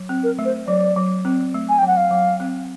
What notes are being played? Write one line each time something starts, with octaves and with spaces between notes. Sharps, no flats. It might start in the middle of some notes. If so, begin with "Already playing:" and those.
Already playing: F#3
C4
A#4
A3
C5
F#3 D5
F#3
C4
A3
G#5
G5
F#3 F#5
F5
F#3
C4